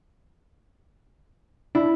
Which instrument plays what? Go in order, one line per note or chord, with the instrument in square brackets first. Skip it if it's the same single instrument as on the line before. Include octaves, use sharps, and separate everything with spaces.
[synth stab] D4 [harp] E4